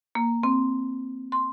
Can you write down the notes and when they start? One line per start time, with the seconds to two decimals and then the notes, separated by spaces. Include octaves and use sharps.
0.15 A#3
0.43 C4
1.32 C6